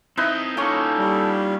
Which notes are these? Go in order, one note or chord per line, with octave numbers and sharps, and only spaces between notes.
C4 D#4 E4 B4 D#5
A#3 C#4 D#4 F4 A4 C#6
G3